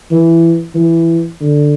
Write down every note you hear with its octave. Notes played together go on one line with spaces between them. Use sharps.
E3
E3
D3